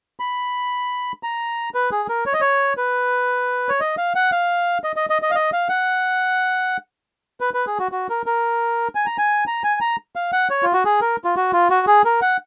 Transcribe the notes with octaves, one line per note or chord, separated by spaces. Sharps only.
B5
A#5
B4
G#4
A#4
C#5
D#5
C#5
B4
C#5
D#5
F5
F#5
F5
D#5
D#5
D#5
D#5
F5
D#5
F5
F#5
B4
B4
G#4
F#4
F#4
A#4
A#4
G#5
A#5
G#5
A#5
G#5
A#5
F5
F#5
C#5
F4
F#4
G#4
A#4
F4
F#4
F4
F#4
G#4
A#4
F#5